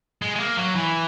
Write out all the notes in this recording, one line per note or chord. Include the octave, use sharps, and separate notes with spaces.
G#3
G#3
A#3
F#3
E3